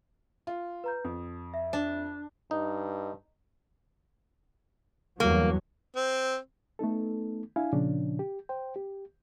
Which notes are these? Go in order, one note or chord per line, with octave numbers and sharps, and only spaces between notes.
F4
B4 A#5 G6
F2 D#6
E5
D4
G2 D#4
E2 G2 F#3 A#3
C4
A3 B3 D#4 A4
D4 E4 F5 G#5
A#2 C#3 F3 C#4 D4
G4
C5 G5
G4